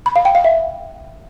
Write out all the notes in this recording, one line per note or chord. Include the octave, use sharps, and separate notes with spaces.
B5
F5
G5
F5
E5